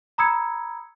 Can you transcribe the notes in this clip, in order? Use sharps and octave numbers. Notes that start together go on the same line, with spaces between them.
A#5 B5 D#6 E6 G#6 C#7